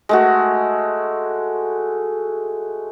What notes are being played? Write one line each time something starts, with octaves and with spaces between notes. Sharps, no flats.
G#3 A3 F#4